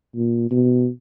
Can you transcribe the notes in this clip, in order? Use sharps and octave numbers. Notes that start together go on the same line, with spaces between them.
A#2
B2